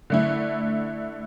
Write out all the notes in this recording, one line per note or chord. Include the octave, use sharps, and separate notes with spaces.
D3 A3 E4